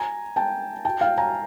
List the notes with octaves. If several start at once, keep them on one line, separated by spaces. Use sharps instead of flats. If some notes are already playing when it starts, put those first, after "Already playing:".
Already playing: G#5 A#5
G5 A5
G5 A5
F5 G5
G#5 A#5